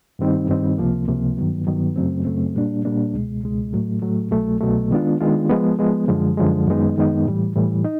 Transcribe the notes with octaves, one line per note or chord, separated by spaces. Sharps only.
G2 D#3 G3 C4 D#4
G2 D#3 G3 C4 D#4
C#2 C3 F3 A#3
C#2 C3 F3 A#3
G2 D#3 F#3 B3
G2 D#3 F#3 B3
F#2 C#3 F#3 A3 C4
F#2 C#3 F#3 A3 C4
A#2 G3 A#3 D4
A#2 G3 A#3 D4
C#2 B2 G#3
C#2 B2 G#3
A2 F#3 A3
A2 F#3 A3
C2 B2 F#3 A3
C2 B2 F#3 A3
D#3 G#3 B3 D4 F4
D#3 G#3 B3 D4 F4
F3 G#3 B3
F3 G#3 B3
F#2 D3 F3 G#3
F#2 D3 F3 G#3
F#2 D#3 G#3 B3 D#4
F#2 D#3 G#3 B3 D#4
A2 E3 G3
A2 E3 G3
D#4